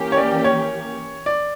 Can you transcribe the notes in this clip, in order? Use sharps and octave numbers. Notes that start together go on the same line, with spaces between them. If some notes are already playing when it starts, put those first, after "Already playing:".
Already playing: E3 A#3 C#4 G4
C#5
D5
C#5
D5